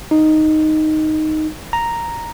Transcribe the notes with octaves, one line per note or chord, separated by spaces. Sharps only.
D#4
A#5